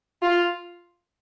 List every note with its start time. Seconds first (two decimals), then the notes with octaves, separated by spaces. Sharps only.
0.22 F4